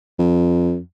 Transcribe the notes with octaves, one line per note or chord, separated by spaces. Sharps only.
F2